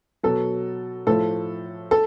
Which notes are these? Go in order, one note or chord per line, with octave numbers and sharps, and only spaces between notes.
B2 F#3 A4
A2 F3 A4
A4